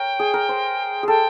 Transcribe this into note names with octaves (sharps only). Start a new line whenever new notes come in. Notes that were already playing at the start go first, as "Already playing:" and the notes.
Already playing: A#4 C#5 G5
G#4
A#4
C5
G#4 A4 G5